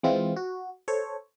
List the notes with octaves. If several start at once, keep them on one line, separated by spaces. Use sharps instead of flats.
E3 G#3 C4 E4 F4
F#4
A4 C5 C#5